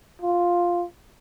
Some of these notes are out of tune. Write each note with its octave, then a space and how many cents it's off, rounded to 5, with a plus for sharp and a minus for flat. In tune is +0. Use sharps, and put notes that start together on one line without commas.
F4 +5